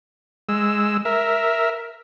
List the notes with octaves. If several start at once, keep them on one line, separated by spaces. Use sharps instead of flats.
G#3 E6
A#4 E5